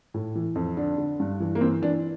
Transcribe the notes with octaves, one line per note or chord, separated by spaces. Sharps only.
A2
E3
F2
D3 D4
D3
G2
E3
A#3
E3 C4
E3 D4